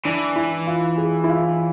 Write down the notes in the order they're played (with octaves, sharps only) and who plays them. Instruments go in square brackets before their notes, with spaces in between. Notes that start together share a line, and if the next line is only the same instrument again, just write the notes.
[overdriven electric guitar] E3 [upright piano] D4
[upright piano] E4
F4
G#4
E4
F4